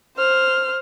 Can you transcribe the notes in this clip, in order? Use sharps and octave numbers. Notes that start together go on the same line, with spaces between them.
C5 F6